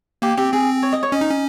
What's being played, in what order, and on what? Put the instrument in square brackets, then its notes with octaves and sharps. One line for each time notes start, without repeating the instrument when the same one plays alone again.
[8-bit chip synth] A#3 [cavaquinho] G4
[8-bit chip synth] C4 [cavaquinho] G4
[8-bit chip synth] C4 [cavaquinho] G#4
[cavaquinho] C#5
D#5
C#5
[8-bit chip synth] C#4 [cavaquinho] D#5
[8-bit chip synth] D#4
C#4